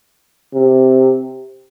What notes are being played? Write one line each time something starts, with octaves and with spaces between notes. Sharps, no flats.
C3